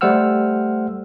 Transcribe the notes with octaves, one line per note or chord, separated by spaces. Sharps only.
G3 A3 C5 F#5 E6 F6